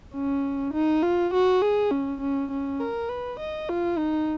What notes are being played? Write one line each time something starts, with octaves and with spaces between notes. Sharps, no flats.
C#4
D#4
F4
F#4
G#4
C#4
C#4
C#4
A#4
B4
D#5
F4
D#4